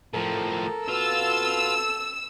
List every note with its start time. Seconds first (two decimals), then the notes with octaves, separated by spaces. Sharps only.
0.14 A2 F3 A4 A#4
0.88 B2 F4 E6